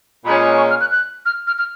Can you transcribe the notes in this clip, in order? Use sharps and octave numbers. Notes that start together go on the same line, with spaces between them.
A#2 G#3 C#4 B5
C#6
F6
F#6
F#6
F6
F6
F6